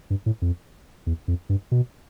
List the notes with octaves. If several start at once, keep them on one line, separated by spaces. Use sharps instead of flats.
G2
A2
F2
E2
F2
G2
B2